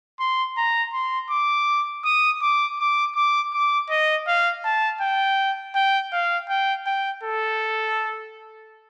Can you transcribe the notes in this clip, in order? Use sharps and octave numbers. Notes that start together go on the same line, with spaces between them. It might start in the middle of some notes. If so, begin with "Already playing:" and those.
C6
A#5
C6
D6
D#6
D6
D6
D6
D6
D#5
F5
A5
G5
G5
F5
G5
G5
A4